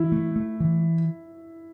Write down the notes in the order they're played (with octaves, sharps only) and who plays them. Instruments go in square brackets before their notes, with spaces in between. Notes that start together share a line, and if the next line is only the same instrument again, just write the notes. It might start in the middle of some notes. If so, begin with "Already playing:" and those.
Already playing: [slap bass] E3 [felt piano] E4
[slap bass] A3
A3
E3